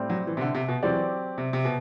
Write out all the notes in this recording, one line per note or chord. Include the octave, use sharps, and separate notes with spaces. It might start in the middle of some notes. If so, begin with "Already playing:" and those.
Already playing: A2 G3 C4
F#3
E3
C3
D3
C3
B2
E3 F#3 C4 G4 D5
C3
C3
B2